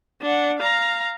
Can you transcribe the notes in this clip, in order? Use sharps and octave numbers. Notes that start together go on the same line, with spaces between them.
D4 F#5
F5 A#5